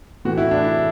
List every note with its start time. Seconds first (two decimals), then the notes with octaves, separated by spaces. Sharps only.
0.25 A2 E3 F#4
0.37 E4
0.51 D4
0.64 E4